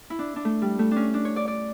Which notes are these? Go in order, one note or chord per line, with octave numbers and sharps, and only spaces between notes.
E4
D4
D4
A3
G3
A3
C#4 D4
D4
C#5
D5
D5